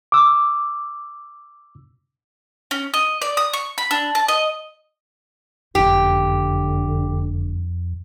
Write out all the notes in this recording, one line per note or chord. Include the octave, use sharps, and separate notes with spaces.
D6 E6
C#4
D#5
D5
D#6
C#6
B5
D4
A5
D#5
F#1 F2 A#2 D3 G4